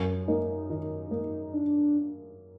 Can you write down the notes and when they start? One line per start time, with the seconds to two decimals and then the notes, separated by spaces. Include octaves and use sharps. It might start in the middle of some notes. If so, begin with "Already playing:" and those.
Already playing: F#2
0.28 A#3 D#4
0.70 D#3 D#4
1.11 A#3 D#4
1.54 D4